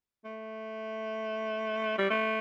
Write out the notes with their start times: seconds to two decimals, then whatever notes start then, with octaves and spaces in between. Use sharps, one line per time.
0.25 A3
1.98 G3
2.10 A3